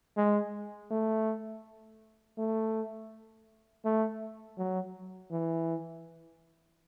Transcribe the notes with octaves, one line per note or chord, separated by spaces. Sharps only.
G#3
A3
A3
A3
F#3
E3